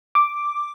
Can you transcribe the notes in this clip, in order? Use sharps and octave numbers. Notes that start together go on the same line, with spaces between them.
D6